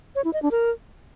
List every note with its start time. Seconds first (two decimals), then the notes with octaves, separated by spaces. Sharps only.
0.15 C#5
0.24 E4
0.33 D#5
0.42 D4
0.51 A#4